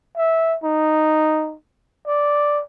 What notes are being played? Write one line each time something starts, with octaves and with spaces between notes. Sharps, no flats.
E5
D#4
D5